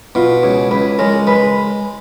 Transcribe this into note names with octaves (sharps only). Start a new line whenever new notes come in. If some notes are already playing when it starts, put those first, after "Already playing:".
B2 F4
C#2 G#4
C#2 B4
G#3 A#4 C#5
G#3 B4